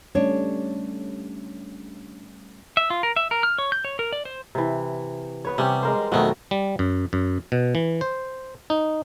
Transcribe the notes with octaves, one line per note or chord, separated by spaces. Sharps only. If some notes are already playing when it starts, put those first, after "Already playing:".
G3 A3 C#4 D4 C#5
E5
F4
A#4
E5
A#4
F6
C#5
G6
C#5
A#4
D5
C5
C3 E3
B3 B4 C#5
C3 G3 B3 C#4 G4
G#3 A#4 C5
F2 B2 D#3 F#3 A3 F#4
G3
F#2
F#2
B2
E3
C5
D#4